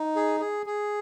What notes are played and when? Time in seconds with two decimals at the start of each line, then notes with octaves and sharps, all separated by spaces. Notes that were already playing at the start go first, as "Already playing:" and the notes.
Already playing: D#4
0.16 G#4
0.40 G#4
0.66 G#4